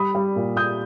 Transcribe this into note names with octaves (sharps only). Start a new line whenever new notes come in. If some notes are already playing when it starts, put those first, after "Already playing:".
Already playing: G3 B5 D#6
G3
A#2
A#2 D#6 G6